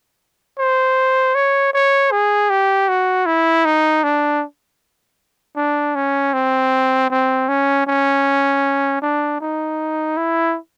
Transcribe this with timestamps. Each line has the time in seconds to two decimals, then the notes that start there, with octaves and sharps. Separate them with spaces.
0.58 C5
1.35 C#5
1.73 C#5
2.11 G#4
2.50 G4
2.88 F#4
3.26 E4
3.65 D#4
4.04 D4
5.56 D4
5.95 C#4
6.34 C4
7.10 C4
7.49 C#4
7.87 C#4
9.02 D4
9.41 D#4
10.17 E4